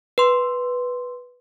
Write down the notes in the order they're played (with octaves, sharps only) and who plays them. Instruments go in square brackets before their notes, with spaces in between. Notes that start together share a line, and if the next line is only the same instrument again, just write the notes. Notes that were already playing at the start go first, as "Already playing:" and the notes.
[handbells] B4 C6